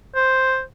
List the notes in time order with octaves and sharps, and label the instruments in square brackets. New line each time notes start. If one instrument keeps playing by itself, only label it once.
[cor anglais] C5